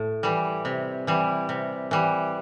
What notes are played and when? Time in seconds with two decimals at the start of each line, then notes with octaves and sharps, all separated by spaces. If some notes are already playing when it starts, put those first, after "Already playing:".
Already playing: A2
0.23 E3 G3
0.65 C3
1.07 E3 G3
1.49 C3
1.91 E3 G3